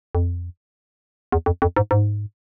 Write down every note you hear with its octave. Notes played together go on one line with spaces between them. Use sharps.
F2
E2
F2
F2
G#2
G#2